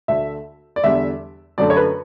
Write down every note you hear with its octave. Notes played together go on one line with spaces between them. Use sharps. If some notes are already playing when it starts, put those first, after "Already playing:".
D2 D3 A3 E5
D5
E2 D3 G3 E5
F#2 D3 A3 D5
C#5
B4